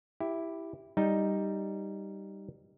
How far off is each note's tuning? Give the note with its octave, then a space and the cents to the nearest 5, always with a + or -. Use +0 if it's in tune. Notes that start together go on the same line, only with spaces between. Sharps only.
E4 +0 G4 +0
G3 +0 D#4 +0